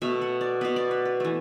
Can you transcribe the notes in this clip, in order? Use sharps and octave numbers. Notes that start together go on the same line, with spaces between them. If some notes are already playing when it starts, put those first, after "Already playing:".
B2 A3 E5
F#5
D5
B2 B3 B4
D5
B4
B4
E3 A3